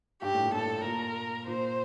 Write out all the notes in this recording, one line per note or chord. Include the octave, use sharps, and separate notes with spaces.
G2 G4
A2
A#2
A2 A4
A#2 A#4
A#2 C5